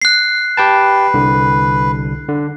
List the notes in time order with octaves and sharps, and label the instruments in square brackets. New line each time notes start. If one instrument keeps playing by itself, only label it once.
[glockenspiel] F#6 C7
[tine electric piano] G4 G5 A5 [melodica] B4
[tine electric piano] C2 D3
D3